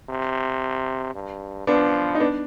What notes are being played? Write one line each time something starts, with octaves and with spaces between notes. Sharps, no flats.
C3
G2
F3 B3 D4
D#4
B3 D4